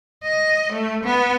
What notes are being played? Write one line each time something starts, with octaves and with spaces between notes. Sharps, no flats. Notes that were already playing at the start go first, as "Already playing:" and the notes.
D#5
A3
B3